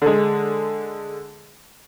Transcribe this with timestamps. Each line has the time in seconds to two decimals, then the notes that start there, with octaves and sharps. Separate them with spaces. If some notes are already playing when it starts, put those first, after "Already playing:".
0.02 D3 G#3